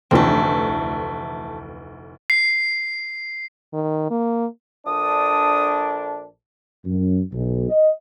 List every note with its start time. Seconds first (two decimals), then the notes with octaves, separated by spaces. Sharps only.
0.11 F1 D2 E3 A3 C4
2.30 C7
3.73 D#3
4.11 A#3
4.87 A#1 D4 A4 D#6
6.85 F#2
7.32 B1
7.69 D#5